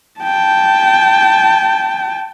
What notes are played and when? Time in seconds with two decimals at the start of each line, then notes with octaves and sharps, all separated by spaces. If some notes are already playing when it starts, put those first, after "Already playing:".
0.20 G5 A5